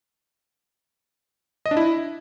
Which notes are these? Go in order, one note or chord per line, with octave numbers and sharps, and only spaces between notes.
D#5
D4
E4